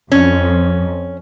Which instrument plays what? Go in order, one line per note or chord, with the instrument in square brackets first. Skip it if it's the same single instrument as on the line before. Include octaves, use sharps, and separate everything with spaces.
[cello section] F2 [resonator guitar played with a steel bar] C#4